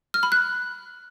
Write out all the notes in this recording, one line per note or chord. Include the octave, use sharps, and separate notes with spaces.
F6
B5
F#6